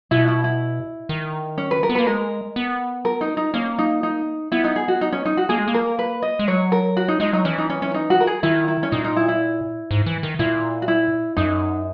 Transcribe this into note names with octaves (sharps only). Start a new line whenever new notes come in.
B2 E4
E4
E4
D#3
C#4
B4
A#4
B3
A#3 B4
G#3 A#4
B3
A#4
D#4
D#4
A#3 C#4
D#4
D#4
B3 E4
D#4
G#4
F#4
D#4
C#4
D#4
F#4
A#3 G#4
G#3
A#3
A#4
B4
D#5
G#3
F#3 C#5
A#4
F#4
D#4
G#3 D#4
F#3 D#4
E3 C#4
D#4
C#4
C#4
D#4
F#4
A#4
G#4
D#3 E4
E4
C#4
A#2 D#4
D#4
E4
E4
G#2
E3
D#3
A#2 E4
F#4
E4
F#2 D#4